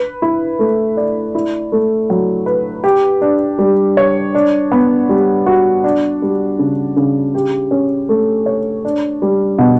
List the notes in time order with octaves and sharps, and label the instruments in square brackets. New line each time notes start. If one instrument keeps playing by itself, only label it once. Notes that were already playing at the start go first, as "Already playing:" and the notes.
Already playing: [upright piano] B4
E4
A3
D5
E4
A3
F#3
B4
G4
D4
G3
C#5
D4
B3
G3
F#4
D4
G3
C#3
C#3
G4
C#4
A3
C#5
D4
G3
B2